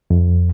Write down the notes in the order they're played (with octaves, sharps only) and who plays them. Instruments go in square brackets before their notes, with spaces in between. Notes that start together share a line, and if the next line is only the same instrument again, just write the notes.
[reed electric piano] F2